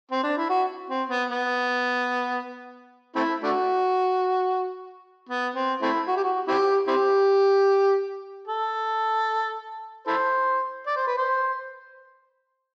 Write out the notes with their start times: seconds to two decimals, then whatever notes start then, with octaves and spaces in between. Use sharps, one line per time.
0.11 C4
0.23 D4
0.37 E4
0.49 F#4
0.90 C4
1.09 B3
1.29 B3
3.16 A3 C4 E4
3.43 A3 D4 F#4
5.29 B3
5.56 C4
5.82 A3 C4 E4
6.08 F#4
6.16 G4
6.23 F#4
6.48 C4 E4 G4
6.87 C4 E4 G4
8.47 A4
10.07 E4 A4 C5
10.87 D5
10.96 C5
11.07 B4
11.18 C5